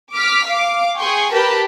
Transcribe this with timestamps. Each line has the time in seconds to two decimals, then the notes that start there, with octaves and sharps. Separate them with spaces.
0.14 D6 F6 B6
0.45 F5 D6
0.98 G#4 G5 G#5 C6 C#6
1.32 G4 A#4 B4 G5 A5 B5